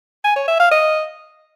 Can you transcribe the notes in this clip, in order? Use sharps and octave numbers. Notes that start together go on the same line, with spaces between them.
G#5
C#5
E5
F5
D#5